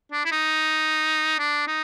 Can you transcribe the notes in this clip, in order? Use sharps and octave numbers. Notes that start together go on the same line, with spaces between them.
D4
E4
D#4
D4
D#4